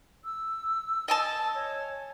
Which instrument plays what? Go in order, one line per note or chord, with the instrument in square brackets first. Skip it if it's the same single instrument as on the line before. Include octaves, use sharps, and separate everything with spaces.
[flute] E6
[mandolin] D#5 G#5 A5
[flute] C#5